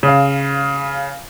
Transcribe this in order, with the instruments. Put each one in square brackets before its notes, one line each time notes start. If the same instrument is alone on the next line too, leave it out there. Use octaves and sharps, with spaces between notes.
[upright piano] C#3 F5